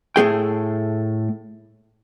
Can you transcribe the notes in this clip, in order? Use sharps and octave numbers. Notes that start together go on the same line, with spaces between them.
A2 A3 G#4 G5